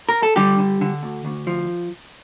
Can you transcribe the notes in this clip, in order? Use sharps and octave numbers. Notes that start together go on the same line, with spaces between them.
A#4
A4
D3 G3 G4
D3
D3
D2
D2
F3